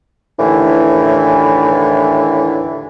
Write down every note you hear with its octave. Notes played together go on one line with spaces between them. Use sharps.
D#2 A2 D3 E3